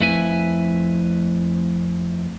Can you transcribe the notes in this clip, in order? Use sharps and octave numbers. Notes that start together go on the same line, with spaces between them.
F2 A3 E4 B4 E5 G#5